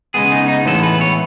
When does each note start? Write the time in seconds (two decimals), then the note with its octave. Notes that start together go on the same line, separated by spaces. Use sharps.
0.14 C#3 G#3 B3 G#4
0.32 D#4
0.48 D#4
0.65 A2 E3 G#3 B3 A4
0.83 B4
1.01 C#5